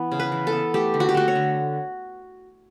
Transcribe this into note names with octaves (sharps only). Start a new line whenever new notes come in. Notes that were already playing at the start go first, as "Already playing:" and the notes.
Already playing: E3 B3
C#3
B4
E3
A4
B3
A3 G4
D3
F#4
G4
A3 F#4
C#5
D3